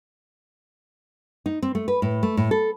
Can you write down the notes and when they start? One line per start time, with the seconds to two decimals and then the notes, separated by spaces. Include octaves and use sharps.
1.46 D#4
1.62 C4
1.75 A3
1.88 B4
2.02 A2
2.23 A3
2.37 A2
2.51 A4